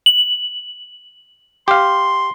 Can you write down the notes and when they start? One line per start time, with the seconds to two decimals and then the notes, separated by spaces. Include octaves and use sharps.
0.06 F#7
1.68 G4 F5 C6